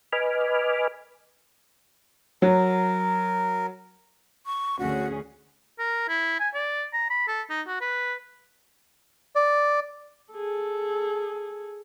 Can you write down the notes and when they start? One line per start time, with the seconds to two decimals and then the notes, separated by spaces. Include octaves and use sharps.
0.12 B4 D#5 G#5 B5 D6 F6
2.42 F#3 A#4
4.46 C#6
4.79 D2 C#4 F#4 G#4
5.79 A#4
6.08 E4
6.40 G#5
6.54 D5
6.93 A#5
7.10 B5
7.28 A4
7.50 D#4
7.67 F#4
7.81 B4
9.36 D5
10.33 G#4 A4